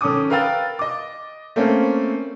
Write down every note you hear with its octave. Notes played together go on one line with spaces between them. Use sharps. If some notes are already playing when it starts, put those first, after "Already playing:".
D#3 C#4 A4 D6 D#6
A#4 B4 F5 G5 E6 A6
D#5 D6
A3 A#3 C4 C#4